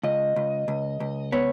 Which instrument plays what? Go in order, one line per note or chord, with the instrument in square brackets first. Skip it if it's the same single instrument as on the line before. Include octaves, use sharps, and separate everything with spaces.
[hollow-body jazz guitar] C#2 [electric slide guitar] D#5
[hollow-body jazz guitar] C#2
C#2
C#2
[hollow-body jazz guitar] B3 [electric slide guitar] C#5